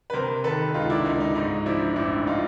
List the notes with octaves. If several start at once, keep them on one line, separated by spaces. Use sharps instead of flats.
B4
C3 A#4 C5
D#3 A4 B4
C#2 D#4 F4
D4 E4
C#2 D#4
D#4
G#2 D#4
F3 D4 E4
A1 D4 E4
D#4 F4